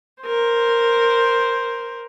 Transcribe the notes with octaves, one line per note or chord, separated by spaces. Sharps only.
A#4 C5